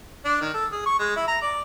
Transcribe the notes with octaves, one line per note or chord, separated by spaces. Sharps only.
D4
D#3
A4
G#4
C#6
G#3
E4
A#5
D5